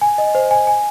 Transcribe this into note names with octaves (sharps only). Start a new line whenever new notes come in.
G#5
D#5
C5
G#5
G#5